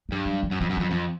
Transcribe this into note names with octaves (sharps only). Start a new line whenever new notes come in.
G2 F#3
F#3
F#3
F#2
F2 F#3
F#2
F2 F#3
F2 F3